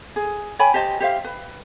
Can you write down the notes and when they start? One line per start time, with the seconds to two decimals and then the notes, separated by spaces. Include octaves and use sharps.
0.16 G#4
0.59 C#5 G5 G#5 B5
0.74 G4 C5 D#5 A5
1.00 G4 C5 E5 F5
1.24 B4